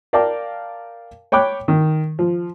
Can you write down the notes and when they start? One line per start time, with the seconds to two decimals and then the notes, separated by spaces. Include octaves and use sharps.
0.13 A#4 D5 F5 G5 A5 D6
1.32 C#5 G5 B5 D6 F#6
1.68 D#3
2.19 F3